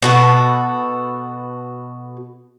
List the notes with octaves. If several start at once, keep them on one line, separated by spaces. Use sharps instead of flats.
B2 F#4 A4